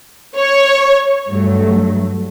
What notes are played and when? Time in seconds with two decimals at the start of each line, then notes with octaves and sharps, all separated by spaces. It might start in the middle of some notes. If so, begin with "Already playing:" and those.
0.37 C#5
1.28 G2 F#3 A3